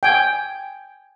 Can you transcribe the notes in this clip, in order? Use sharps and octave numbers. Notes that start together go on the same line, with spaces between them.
G5 G#5